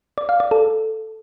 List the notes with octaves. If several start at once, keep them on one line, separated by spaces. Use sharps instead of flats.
D5
F5
D5
A4